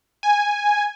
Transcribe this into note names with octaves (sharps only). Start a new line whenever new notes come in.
G#5